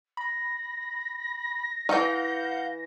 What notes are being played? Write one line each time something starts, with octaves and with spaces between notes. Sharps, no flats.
B5 A#6
D#3 E3 F5 F#5 G6